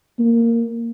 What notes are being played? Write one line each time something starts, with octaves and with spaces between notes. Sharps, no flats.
A#3